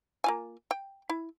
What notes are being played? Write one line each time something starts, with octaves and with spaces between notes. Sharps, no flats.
A#3 F4 G#5
G5
E4